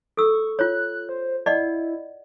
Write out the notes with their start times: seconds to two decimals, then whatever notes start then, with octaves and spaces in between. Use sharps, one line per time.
0.17 A4 C#6 E6
0.59 F4 C#5 F#6
1.09 C5
1.46 E4 D5 D#5 F#5